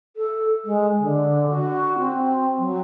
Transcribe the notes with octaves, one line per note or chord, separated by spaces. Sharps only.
A4
G#3
D3
F#4
C4
F#3